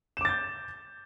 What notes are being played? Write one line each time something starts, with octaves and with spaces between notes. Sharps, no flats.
D6 G6 A6 E7